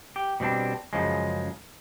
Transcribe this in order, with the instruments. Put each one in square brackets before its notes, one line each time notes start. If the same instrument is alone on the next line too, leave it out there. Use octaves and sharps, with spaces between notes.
[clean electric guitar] G4
B2 G3 C4 D4
F#2 C#3 F3 G#3